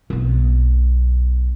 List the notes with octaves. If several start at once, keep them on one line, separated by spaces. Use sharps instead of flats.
B1 B3